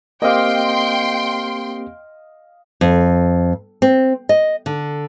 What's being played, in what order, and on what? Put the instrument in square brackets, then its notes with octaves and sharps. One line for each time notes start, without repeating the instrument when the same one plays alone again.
[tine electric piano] A#3 C4 G4 [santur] D#5 F5 [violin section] G5 C6
[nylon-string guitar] F2
C4
D#5
D3